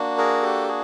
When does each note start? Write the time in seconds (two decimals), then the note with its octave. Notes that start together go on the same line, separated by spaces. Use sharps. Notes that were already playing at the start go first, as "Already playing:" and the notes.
Already playing: A#3 D4 F#4
0.18 G#4 A#4
0.43 G4 A4
0.68 F#4 G#4